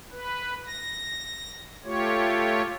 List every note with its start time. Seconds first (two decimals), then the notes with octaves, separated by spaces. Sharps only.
0.12 B4
0.67 A#6
1.85 A3 F4 G4 C#5